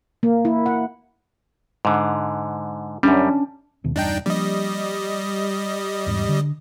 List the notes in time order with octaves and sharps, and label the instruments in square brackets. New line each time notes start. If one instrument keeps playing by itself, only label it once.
[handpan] A#3
E4
F#5
[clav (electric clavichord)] G#2 D3
[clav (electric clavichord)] F#2 G3 [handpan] C#4 D4
[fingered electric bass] D1 D#2 B2
[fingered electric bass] E1 G2 [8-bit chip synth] D4 D#4 G5
[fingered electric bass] F3 A#3 D4 [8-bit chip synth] G3 D#5
[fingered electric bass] E2 G#2
D3